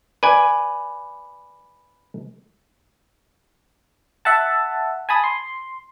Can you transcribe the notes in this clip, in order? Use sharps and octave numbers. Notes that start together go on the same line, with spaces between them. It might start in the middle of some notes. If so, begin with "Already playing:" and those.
B4 D5 G#5
E5 F#5 A5
G#5 A5 B5 D#6
C6